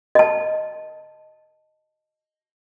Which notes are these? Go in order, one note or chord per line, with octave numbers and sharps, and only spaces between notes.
D#5 A5